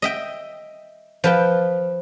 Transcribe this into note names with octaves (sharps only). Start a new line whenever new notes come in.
D#5 E5 G5
F3 B4 G5